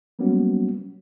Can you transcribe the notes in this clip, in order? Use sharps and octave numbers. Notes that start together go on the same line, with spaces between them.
F#3 G3 A#3 B3 C#4 F#4